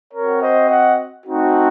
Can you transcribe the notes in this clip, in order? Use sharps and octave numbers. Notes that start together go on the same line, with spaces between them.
C4 F#4 A#4 C#5
C5 D#5
D#5 F#5
A3 C4 D#4 F#4